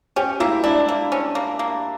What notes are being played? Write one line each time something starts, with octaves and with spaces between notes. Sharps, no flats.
C#4 G4
A#3 E4
D4 E4
A#3
C#4
A#3
A#3